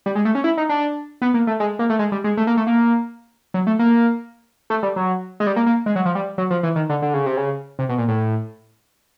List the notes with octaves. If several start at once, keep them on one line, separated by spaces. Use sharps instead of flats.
G3
G#3
A3
C#4
E4
D#4
D4
B3
A#3
A3
G#3
A#3
A3
G#3
G3
G#3
A3
A#3
A3
A#3
F#3
A3
A#3
A3
G3
F#3
G#3
G3
A#3
A#3
G#3
F#3
F3
G3
F#3
F3
E3
D#3
D3
D3
C#3
C3
C#3
C3
B2
A#2
A2